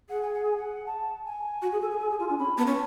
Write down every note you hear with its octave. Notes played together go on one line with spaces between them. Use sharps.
G#4 F#5
G#5
F#5
G#5
F#5
A5
G#5
F#4
G#4
A4
G#4
A4
G#4
F4
D4
C#4 B5
B3 A5
C#4